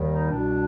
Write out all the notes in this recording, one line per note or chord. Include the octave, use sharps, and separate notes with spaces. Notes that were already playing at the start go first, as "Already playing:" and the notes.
Already playing: D#2 D#3 G3
D#4
C2 B2 G3 D4